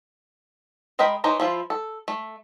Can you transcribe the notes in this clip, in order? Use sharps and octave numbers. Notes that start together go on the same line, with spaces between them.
G#3 A#4 D#5 G5 B5
E3 D#4 C5 C#5 A#5
F3 E4 F4
A4
A3